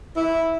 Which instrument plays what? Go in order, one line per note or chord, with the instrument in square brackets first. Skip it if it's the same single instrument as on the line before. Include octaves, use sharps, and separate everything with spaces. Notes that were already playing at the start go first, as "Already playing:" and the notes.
[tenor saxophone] E4